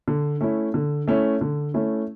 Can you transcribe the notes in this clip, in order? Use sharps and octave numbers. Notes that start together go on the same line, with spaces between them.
D3
A3 C#4 E4
D3
A3 C#4 E4
D3
A3 C#4 E4